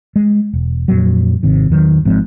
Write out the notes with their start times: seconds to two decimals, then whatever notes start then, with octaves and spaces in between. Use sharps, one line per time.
0.16 G#3
0.53 E1
0.88 F2 A#2 F#3
1.43 G#1 C3 D#3
1.70 E2 D#3 F#3
2.05 G#1 G#2 F3 C4